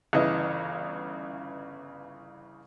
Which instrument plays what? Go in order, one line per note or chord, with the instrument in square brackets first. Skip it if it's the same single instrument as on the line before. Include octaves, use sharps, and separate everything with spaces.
[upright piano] G1 C#3 E3 D#5